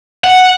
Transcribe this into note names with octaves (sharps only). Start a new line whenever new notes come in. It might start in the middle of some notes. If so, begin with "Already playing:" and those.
F#5